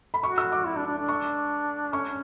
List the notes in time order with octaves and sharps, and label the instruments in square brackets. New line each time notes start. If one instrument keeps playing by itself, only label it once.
[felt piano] B5
[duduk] F#4 [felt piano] C#6
[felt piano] E6
D6
[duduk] E4
D4
D4
D4
[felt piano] C#6
[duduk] C#4 [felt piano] C#6